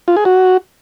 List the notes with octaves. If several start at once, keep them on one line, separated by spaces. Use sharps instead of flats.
F4
G#4
F#4